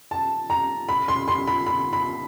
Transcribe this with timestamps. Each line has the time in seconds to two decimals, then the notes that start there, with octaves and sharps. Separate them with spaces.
0.11 A5
0.50 A#5
0.89 B5
1.08 C6
1.28 C6
1.47 B5
1.66 B5
1.93 B5